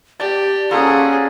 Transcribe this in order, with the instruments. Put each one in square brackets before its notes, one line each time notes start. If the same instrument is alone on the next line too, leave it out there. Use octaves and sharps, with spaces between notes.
[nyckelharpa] G4 [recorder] D5 [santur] A5
[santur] F3 A#3 A4 [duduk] C#4 [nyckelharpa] F#4 G#4